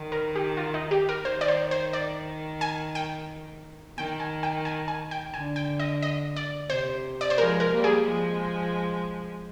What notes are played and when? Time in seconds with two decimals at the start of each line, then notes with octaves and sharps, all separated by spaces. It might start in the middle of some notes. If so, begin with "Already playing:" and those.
Already playing: D#3
0.12 A#4
0.36 G4
0.57 F4
0.74 D#4
0.91 G4
1.09 A#4
1.25 D#3 C5
1.41 D5
1.48 C5
1.71 C5
1.93 D5
2.61 G#5
2.95 G5
3.98 D#3 G5
4.20 G#5
4.43 G5
4.65 G#5
4.88 G#5
5.11 G5
5.34 D3 G#5
5.56 G5
5.80 D#5
6.02 D#5
6.36 D5
6.70 C3 C5
7.21 D5
7.30 C5
7.37 F3 G#3 A#4
7.60 A#4
7.72 G3 A#3
7.84 G#4
8.06 F3 G#3